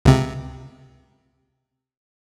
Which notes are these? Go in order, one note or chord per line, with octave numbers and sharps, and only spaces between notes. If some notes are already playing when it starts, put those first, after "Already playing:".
C#2 C3